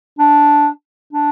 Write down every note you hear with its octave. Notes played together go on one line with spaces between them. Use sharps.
D4
D4